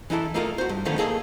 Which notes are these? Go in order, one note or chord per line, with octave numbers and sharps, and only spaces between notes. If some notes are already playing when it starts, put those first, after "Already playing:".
E3 D#4 E4 A4
A3 A#3 D#4 F4 A4 A#4
F#4 C5
G2
D3 D#3 F3 A3 B3
A#3 G#4 A4 C#5 D#5